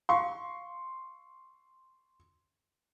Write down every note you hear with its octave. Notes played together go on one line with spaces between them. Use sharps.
F5 C6 C#6